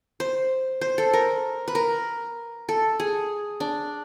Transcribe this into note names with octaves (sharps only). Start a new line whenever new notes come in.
C5
C5
A4
A#4
B4
A#4
A4
G#4
D4